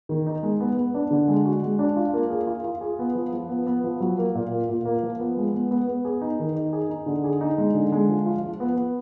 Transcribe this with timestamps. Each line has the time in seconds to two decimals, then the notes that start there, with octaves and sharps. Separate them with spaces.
0.09 D#3
0.27 D#4
0.43 G#3
0.60 B3
0.77 B3
0.94 D4
1.11 D3
1.28 G#3
1.45 F#4
1.62 G#3
1.79 D4
1.96 F4
2.14 A#3
2.30 G#4
2.47 F4
2.64 F4
2.81 G#4
2.99 B3
3.15 F3
3.33 F3
3.49 B3
3.67 B3
3.84 F3
4.00 F#3
4.18 A#3
4.35 A#2
4.51 A#3
4.69 A#2
4.85 A#3
5.03 F3
5.20 B3
5.37 G#3
5.54 B3
5.71 B3
5.87 B3
6.05 G#4
6.21 D#4
6.39 D#3
6.56 D#4
6.73 G#4
6.90 D#4
7.06 D3
7.24 G#4
7.41 D#4
7.58 G#3
7.74 D3
7.92 G#3
8.09 F3
8.26 F4
8.43 F3
8.60 B3
8.77 B3